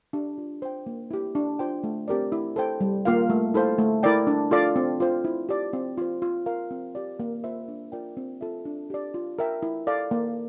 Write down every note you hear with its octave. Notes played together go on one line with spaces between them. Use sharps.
D4 G4
F4
C5 G5
A#3
E4 G4
D4
F4 C5 G5
A3
C4 G4 A#4 D5
E4
A4 C5 G5
G3
A#3 F4 A#4 F5
A3
E4 A4 C5 F5
A3
E4 A#4 D5 G5
D4
F4 A4 D5 F5
C4
F4 C5
E4
G4 D5
C4
F4 C5
F4
A#4 F5
C4
G4 D5
A#3
F4 C5 E5
D4
F4 A#4 D5 G5
C4
F4 A4 E5
D4
G4 D5
F4
A#4 E5 G5
E4
A4 D5 F5
A#3